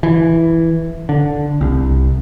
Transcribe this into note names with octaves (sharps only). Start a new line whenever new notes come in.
E3
D3
C2